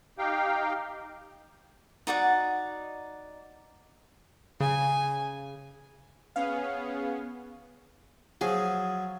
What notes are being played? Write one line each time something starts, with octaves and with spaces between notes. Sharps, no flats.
D#4 G4 F5 G5
D#4 F#4 D5 F#5
C#3 G#5
B3 C#4 G#4 F5
F3 F#3 G#4